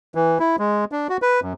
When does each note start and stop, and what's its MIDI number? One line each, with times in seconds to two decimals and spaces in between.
0.15 0.38 52
0.40 0.56 64
0.59 0.85 56
0.92 1.07 62
1.09 1.17 66
1.22 1.40 71
1.42 1.53 42